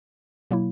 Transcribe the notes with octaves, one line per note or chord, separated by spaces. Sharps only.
B2 F#3 A#3 E4